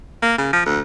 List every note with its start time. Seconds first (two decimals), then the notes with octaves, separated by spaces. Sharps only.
0.22 A#3
0.38 C#3
0.53 F3
0.66 D2